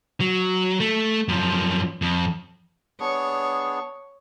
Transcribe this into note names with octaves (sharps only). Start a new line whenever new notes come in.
F#3
A3
F#2 F3
F2
B3 D4 G#4 C#5